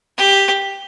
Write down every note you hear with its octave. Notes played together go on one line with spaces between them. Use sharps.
G4